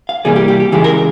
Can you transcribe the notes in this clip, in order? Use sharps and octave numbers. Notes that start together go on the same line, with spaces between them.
F5
C3 E3 G3 A#3 G#4
G4
G4
G4
C#3 E3 G#3 G4
A#4